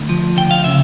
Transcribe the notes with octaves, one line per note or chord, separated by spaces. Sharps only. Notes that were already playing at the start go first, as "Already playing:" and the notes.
Already playing: D2
F3
D2 G5
F5
C#3 E5